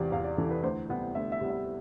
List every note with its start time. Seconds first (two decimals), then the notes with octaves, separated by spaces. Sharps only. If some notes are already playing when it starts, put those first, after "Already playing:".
Already playing: E2 C3 E3 D5 F5
0.12 E2 F5
0.24 D5
0.37 C3 E3 A4
0.50 B4
0.63 D2 C5
0.89 C3 G3 B3
1.15 D2 E5
1.32 E5
1.41 C3 G3 B3
1.50 E5